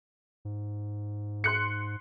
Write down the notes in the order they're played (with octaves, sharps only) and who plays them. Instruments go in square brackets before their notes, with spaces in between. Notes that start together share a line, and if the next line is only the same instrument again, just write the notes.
[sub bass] G#2
[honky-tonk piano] C6 F#6 C#7